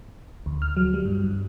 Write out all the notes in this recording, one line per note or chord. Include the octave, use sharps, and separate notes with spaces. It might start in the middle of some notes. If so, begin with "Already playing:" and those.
D2
F6
F#3
G3
G2
G2